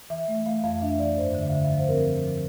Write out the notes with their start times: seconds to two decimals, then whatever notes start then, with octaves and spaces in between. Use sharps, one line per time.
0.10 E3 E5
0.28 A3
0.46 A3 F5
0.64 F2 F5
0.82 D4 E5
0.99 E3 D5
1.17 G2 C5
1.35 D3
1.41 E5
1.48 F5
1.53 D3 E5
1.65 F5
1.71 F3
1.79 C5
1.88 C4 A#4
2.06 F3
2.24 F3